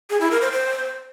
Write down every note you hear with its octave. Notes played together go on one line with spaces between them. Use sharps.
G#4
E4
A#4
C5
C5